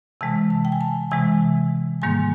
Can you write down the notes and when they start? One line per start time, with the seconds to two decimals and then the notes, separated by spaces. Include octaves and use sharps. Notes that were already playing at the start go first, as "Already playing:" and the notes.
0.21 C3 E3 G#3 A5
0.50 A5
0.65 G5
0.72 G#5
0.81 A5
1.11 C3 E3 G#3 G#5
2.02 G#2 D#3 G3 A#3 G#5